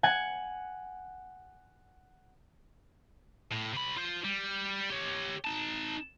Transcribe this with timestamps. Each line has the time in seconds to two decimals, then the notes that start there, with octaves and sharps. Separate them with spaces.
0.03 F#5 G#5 G#6
3.52 A2
3.74 C3 B5
3.97 F4 C5
4.25 G3
4.90 G4 C#5
5.45 D#4 A5